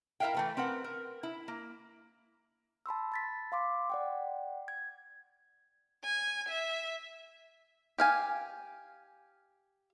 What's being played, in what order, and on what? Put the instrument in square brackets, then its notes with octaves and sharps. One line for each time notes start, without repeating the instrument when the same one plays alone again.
[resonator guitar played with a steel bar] E4 A#4 B4 E5 F5 G5
E3 A3 B4
C4 A#4 B4 F#5
A#4
E4
A#3
[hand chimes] A5 B5 C6 E6
B5 A6 B6
F5 C6 D6
D5 F#5 G5
G#6
[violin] G#5
E5
[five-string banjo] G4 F5 G#5